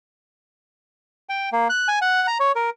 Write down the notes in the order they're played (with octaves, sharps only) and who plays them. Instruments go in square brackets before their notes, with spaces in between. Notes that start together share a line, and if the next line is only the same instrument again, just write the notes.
[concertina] G5
A#3
F#6
G#5
F#5
A#5
C#5
A#4